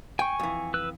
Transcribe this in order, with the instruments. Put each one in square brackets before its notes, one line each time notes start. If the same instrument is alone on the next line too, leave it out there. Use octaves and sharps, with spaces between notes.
[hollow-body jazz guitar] G5 [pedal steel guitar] G#5 C#6
[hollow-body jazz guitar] F2 E3
[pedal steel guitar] B4 E6 F#6